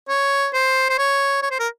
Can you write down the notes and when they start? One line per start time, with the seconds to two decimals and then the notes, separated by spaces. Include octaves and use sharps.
0.09 C#5
0.54 C5
0.89 C5
0.98 C#5
1.42 C#5
1.51 C5
1.59 A#4